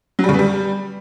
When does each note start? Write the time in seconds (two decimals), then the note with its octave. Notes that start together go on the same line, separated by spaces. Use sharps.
0.19 F#3
0.24 G3
0.29 C#3
0.34 B3
0.39 G3